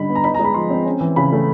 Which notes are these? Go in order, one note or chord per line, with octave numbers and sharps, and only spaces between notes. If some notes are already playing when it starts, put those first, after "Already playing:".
Already playing: D3 G3 D#4 B5
B3
A#5
D#4 B5
A#5
G#3
B5
F3 C6
C4
C#4
E3
C#3 B5
A3